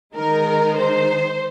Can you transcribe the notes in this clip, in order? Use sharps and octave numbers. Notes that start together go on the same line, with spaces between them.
D#3 G#3 D#4 A#4
C5